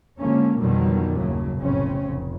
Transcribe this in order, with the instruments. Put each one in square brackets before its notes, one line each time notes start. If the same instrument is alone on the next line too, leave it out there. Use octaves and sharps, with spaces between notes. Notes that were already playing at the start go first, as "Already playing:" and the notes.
[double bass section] D3 F3 G#3 A#3 C#4
F2 B2 D3 D#3 F#3 G3
F#1 D#2 A2 C#3 F#3
F1 B1 A2 C#3 C4 C#4
F1